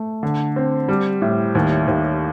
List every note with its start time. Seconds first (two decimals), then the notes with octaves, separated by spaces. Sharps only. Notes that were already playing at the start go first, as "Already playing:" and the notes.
Already playing: A3
0.23 D3
0.56 C4
0.89 G3
1.22 A2
1.55 D#2
1.88 D#2